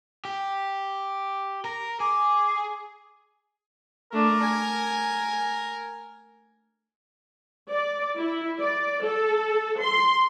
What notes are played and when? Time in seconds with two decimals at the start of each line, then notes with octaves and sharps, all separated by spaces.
0.25 G4
1.65 A#4 A#5
2.00 G#4 D6
4.13 A3 D4 A#4
4.42 G#5
7.70 D5
8.17 E4
8.60 D5
9.03 A4
9.81 C6